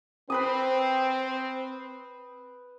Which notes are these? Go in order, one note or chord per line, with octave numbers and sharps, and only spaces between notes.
C4 B4 B5 D#6